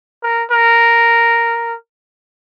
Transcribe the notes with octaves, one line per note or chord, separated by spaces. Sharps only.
A#4
A#4